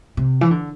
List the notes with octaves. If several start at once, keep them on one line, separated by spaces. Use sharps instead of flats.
C3
E3
D3